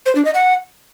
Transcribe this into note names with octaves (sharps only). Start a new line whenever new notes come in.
C5
D4
D#5
F#5